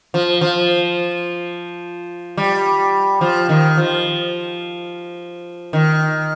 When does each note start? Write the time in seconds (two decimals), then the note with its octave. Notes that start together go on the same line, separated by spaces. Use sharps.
0.14 F3
0.41 F3
2.37 G3
3.21 F3
3.49 D#3
3.77 F3
5.73 D#3